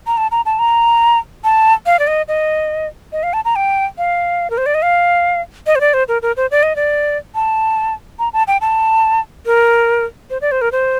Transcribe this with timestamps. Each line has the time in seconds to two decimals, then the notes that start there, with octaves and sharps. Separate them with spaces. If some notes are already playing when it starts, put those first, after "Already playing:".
0.07 A#5
0.17 A5
0.31 A#5
0.46 A5
0.59 A#5
1.44 A5
1.86 F5
1.99 D5
2.07 D#5
2.28 D#5
3.12 D#5
3.23 F5
3.33 A5
3.45 A#5
3.56 G5
3.98 F5
4.50 A#4
4.58 C5
4.66 D5
4.74 D#5
4.82 F5
5.67 D#5
5.76 C5
5.81 D5
5.94 C5
6.08 A#4
6.22 A#4
6.37 C5
6.51 D5
6.63 D#5
6.76 D5
7.35 A5
8.19 A#5
8.33 A5
8.48 G5
8.61 A5
9.46 A#4
10.30 C5
10.41 D5
10.52 C5
10.61 A#4
10.72 C5